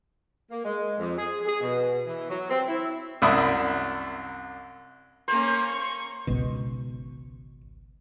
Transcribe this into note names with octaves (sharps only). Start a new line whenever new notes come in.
A#3
G#3
F2
G#4
G#4
B2
E3
F#3
C4
E4
C2 F#2 E5 B5 D#6
A#3 C#4 C5
C#6
G#1 C#2 B2